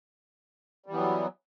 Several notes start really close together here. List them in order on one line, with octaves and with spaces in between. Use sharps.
G3 E3 B3 F#3